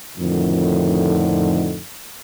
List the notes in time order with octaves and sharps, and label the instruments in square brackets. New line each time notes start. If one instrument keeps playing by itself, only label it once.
[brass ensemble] F2 A2 D3 D#3